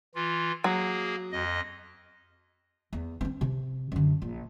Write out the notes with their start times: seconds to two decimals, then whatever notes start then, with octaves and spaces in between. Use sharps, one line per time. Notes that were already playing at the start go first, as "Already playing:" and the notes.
0.15 E3 F4
0.64 F#3 A#3 G#4
1.32 F2 D#5
2.93 E2
3.21 B3 C4
3.41 C3
3.92 F#2 D3
4.22 A#1